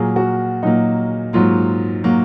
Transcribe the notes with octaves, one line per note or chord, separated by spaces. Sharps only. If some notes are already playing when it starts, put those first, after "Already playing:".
Already playing: A#2 F#3 A#3 G#4
F#4
A#2 F#3 A#3 D#4
G#2 F#3 A#3 F4
F#3 A#3